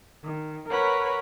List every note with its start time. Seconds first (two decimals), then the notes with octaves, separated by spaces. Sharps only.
0.24 D#3
0.70 A#4 B4 C#5 F#5 B5